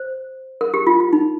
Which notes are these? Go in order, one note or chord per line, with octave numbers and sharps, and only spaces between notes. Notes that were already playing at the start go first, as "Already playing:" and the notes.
Already playing: C5
A#4
G4
F4
F4
D#4